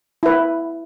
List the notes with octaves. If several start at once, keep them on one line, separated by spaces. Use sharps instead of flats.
E4 B4